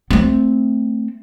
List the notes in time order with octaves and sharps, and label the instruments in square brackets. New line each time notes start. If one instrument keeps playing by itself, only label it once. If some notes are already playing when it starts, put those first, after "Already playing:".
[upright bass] A3 C4